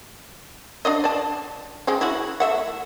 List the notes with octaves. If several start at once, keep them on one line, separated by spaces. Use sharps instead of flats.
D4 D5 D#5
D5 A5
G#3 C4 C#4
E4 F#4
A3 E5 F#5